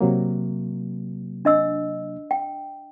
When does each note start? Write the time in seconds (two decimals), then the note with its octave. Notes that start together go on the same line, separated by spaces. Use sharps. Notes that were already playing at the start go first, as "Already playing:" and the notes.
0.01 C3 F#3 A#3
1.45 D4 D#5 E6
2.31 G5